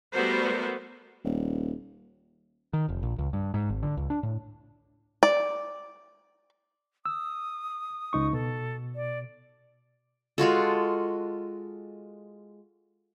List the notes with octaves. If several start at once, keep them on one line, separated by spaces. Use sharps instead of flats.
G3 A3 B3 F#4 A#4 C5
D#1
D#3
F1
A#1
C#2
G2
G#2
G#1
D3
C#2
D4
A2
D5
D#6 E6
C#2 D#4 C#6
B2 A4
D5
G#3 F4 F#4 A4